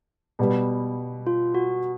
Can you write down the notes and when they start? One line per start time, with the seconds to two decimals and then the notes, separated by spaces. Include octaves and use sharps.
0.39 B2 G3 B3
1.27 F4
1.55 F#4